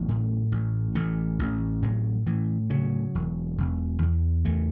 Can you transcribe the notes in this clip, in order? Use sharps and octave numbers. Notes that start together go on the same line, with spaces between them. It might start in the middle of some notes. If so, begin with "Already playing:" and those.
Already playing: A1 F#3 B3
A2
A1
A1 E3 A3
A1
A2 F#3
A2 E3
C#3 F#3
E1
E1
E2
E2 E3 A3